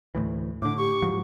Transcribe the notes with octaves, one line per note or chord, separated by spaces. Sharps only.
D2 A2 E3
A2 D3 D4 D6
G4 C#6
G#2 F3 F#3